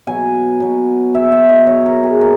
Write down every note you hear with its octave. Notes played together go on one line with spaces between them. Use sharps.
B2 F#3 G#5
B2 F#3
B2 F#3 E5
E5
D#5
B2 F#3 C#5
A#4
G#4
A#2 A#4